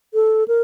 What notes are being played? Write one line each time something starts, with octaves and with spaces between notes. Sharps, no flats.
A4
A#4